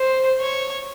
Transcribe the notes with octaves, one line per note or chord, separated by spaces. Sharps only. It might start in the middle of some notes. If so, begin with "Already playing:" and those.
Already playing: C5
C#5